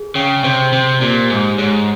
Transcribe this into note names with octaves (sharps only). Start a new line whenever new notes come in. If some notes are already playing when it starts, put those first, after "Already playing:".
Already playing: G#4
C#3 G5
C3 C5
C3 C5
A#2 G4
G#2 G4
G#2 C#5